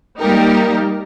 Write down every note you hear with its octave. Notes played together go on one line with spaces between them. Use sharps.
G3 A#3 D#4 G4 A#4